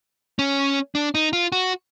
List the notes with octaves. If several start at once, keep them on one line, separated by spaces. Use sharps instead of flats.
C#4
D4
D#4
F4
F#4